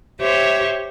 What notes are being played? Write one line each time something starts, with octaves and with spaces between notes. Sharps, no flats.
G4 C5 C#5 E5